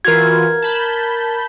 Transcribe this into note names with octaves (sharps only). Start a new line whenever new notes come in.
E3 F4 F#4 A#4 G#6
A5 B5 G6